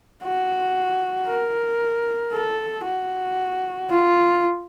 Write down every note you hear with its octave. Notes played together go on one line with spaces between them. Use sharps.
F#4
A#4
A4
F#4
F4